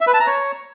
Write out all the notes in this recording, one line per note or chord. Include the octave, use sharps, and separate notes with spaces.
E5
B4
A5
A#5
C#5